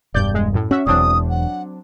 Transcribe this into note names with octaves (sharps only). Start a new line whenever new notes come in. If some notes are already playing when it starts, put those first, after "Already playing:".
E1 G2 D5 G6
G#3
F#2 A2
C#4 F#4 E5
E1 E2 F#3 C4 D4 D#6
F#5